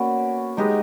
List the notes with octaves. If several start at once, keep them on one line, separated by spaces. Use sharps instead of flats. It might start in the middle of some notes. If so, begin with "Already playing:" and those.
Already playing: A#3 B3 C#4 F#4 B4 D5
G#3 D#4 G4 B4 D#5